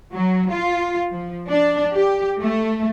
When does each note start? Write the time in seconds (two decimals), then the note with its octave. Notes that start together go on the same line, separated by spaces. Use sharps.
0.14 F#3
0.50 F4
1.11 F3
1.48 D4
1.93 G4
2.40 A3